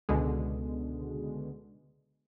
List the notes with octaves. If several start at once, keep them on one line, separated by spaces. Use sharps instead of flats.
C#2 B2 D3 G#3